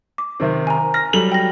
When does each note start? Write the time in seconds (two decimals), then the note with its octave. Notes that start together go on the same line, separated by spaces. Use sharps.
0.18 D6
0.40 C3 D#3 C4
0.67 G#5 A#5
0.94 F6 A#6
1.13 F#3 G3 A4 F#7
1.32 G5 A#6